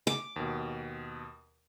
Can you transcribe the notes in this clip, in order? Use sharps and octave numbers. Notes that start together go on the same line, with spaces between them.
D6
D#2 B2